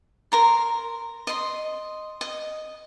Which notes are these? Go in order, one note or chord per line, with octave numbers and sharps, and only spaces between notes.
A#4 A#5 C6
D#5 C6
D#5